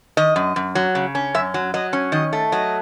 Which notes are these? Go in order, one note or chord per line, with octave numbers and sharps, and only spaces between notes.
D#3 D#5
F#2
F#2
F#3
C#3
C#4
F#2 E5
F#3
F#3 D#5
C#4
D#3 D#5
A3
F#3 D#5